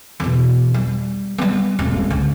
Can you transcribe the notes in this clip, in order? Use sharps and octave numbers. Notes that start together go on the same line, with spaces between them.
E2 B2
G3
G3 B3
D#1 G#1
C#2